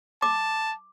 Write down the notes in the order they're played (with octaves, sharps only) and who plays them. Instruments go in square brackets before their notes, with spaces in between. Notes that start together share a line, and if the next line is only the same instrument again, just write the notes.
[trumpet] A5 [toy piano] D6